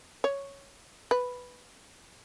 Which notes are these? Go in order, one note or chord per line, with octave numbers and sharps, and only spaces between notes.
C#5
B4